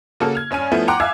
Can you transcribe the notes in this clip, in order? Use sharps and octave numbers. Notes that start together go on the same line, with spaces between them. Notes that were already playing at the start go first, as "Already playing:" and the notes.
C#3 A#3 F#4 A4
F6 G#6
G2 C#4 G#5 D#7
F3 A3 B3 C#4 E4
F#5 G5 A#5 C6 D6 F#6
E5 F5 G#5 E6 F6 G#6